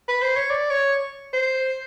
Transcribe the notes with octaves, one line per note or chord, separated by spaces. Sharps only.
B4
C5
C#5
D5
C#5
C5